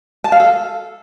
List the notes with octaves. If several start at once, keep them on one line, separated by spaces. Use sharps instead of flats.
A5
F5
A4